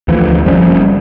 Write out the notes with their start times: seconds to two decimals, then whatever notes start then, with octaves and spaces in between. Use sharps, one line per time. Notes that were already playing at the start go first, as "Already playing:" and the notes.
0.08 D2 E3 F3
0.45 F#1 F3 G3 C#4